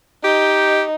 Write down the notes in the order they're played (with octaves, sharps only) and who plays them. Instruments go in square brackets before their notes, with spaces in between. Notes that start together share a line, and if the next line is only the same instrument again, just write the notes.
[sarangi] D#4 [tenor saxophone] G4